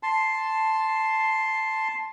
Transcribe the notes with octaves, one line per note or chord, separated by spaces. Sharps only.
A5 C6